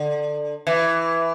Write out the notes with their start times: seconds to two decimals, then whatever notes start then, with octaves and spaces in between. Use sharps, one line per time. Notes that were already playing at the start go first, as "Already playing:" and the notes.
Already playing: D3
0.67 E3